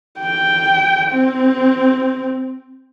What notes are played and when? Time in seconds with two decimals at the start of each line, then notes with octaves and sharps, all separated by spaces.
0.20 G5
1.10 C4